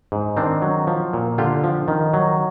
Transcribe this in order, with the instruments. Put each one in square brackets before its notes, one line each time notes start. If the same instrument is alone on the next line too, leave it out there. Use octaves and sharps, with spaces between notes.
[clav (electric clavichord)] G#2
D#3 C4 D4
F#3
F3
A#2
D3 F4 G4
F3
D#3
F#3